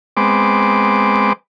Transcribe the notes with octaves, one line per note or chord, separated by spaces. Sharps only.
G#3 B3 C4 D6